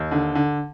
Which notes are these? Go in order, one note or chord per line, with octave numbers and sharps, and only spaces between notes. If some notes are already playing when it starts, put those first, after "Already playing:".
Already playing: D#2
D3
D3